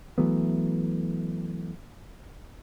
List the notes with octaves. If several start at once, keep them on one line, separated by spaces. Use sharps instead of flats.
E3 F#3 A3 B3